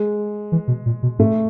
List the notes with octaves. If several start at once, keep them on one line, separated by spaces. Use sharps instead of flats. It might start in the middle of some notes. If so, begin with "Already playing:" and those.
Already playing: G#3
E3
B2
A#2
B2
G#2 A3